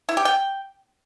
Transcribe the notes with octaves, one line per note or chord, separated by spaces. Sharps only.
E4
G4
G5